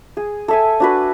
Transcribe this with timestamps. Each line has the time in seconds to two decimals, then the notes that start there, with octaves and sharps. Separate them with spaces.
0.17 G#4
0.48 A4 E5 G#5
0.80 D4 F#4 B4